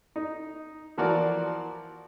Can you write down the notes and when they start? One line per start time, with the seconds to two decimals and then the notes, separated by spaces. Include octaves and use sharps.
0.16 D#4
0.98 E3 F3 F#4 A#4 D5